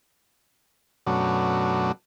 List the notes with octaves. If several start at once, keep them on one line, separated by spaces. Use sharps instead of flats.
F#2 B2 F#3 A3 C#4 D4